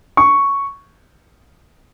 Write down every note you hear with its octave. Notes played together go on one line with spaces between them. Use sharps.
C#6